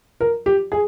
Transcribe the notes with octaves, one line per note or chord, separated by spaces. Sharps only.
A#4
G4
G#4